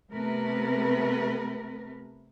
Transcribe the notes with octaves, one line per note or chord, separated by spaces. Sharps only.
C3 A3 B3 A#4 B4